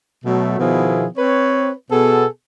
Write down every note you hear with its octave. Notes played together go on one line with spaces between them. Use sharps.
B2 F#3 A3
B2 D#3 F3 B3 E4 G#4
C4 B4 C#5
B2 B3 G#4 A4